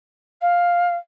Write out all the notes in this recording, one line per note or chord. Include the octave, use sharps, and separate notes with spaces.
F5